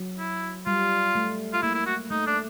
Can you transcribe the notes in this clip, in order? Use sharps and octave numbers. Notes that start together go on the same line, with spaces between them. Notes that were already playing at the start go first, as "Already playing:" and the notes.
Already playing: F#3
E4
G3 F4
A3
F4
A#3 E4
E4
F#4
A3 D#4
D4